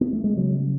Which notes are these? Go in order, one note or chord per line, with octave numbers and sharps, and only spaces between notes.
B3
A3
G#3
C#3 F#3